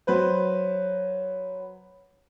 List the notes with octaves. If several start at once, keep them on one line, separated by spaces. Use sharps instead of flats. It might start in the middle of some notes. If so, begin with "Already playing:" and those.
F#3 B4 C5